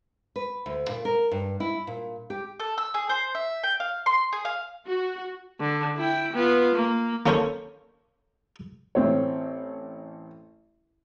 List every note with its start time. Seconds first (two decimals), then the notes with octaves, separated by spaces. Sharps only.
0.36 B4
0.66 D2
0.89 A#2
1.05 A#4
1.31 G2
1.60 E4
1.87 A#2
2.30 G4
2.60 A4
2.78 E6
2.94 G#4
3.09 C5
3.35 E5
3.63 G5
3.80 F5
4.06 C6
4.33 G#4
4.45 F5
4.87 F#4
5.60 D3
5.96 E4 G5
6.33 B3 F4
6.75 A#3
7.26 A#3 C#4 A4 A#4 C5 C#5
8.95 A1 C4 C#5